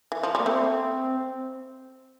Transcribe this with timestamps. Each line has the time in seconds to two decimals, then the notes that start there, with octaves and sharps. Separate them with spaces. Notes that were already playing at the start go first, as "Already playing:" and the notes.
0.12 E3
0.23 F3
0.35 G3 A#3
0.46 A3 C4